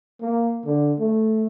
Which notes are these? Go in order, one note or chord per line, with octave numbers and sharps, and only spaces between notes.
A#3
D3
A3